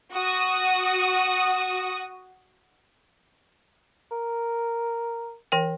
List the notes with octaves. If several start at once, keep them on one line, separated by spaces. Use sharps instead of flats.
F#4 D#6
A#4
E3 A#4 G5